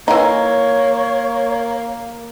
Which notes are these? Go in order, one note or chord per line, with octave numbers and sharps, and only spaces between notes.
E3 A#3 D#4 C#5